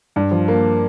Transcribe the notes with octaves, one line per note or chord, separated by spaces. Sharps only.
G2
F3
A#3